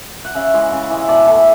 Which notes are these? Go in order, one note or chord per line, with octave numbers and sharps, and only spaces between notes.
F#5
C#3 E5
E3 G#3
C#3
E3 G#3
E5
B2 D5
A3 E4